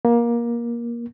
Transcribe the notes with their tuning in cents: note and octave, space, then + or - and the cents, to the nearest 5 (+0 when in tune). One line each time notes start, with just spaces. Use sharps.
A#3 +20